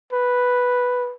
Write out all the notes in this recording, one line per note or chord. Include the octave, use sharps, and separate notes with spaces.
B4